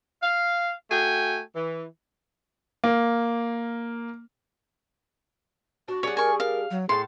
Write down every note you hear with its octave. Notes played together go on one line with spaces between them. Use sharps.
F5
A3 F#4 G5 G#5
E3
A#3
D4 F#4
G3 D4 G#4 C#5 F#5
A#4 G#5 C#6
A#4 F5
F#3
A2 E4 G#4 A5 C6